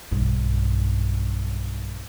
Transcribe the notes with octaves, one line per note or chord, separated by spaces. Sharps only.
B1 G2